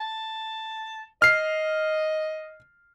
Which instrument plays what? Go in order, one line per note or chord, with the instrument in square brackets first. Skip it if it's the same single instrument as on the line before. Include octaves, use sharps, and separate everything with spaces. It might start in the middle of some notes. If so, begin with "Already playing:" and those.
[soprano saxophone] A5
[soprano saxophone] D#5 [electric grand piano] F6 C7